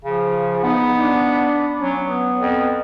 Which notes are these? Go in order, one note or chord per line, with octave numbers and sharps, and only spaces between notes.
C#3 F3
B3 D#4
D4
F#3 C#4
B3
F2